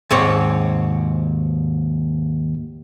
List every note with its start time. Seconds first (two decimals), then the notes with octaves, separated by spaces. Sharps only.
0.11 D#2 G#2 C4 C#5